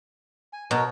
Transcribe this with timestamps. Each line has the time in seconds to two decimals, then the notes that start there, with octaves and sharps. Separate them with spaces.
0.53 G#5
0.71 B2 F#4 A#4 C#5